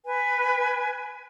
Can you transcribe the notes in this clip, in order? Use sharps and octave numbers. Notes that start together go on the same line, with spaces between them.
B4 G#5